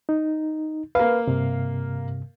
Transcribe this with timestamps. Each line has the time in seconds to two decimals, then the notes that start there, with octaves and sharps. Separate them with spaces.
0.09 D#4
0.95 A#3 B4 F5
1.28 G2 C3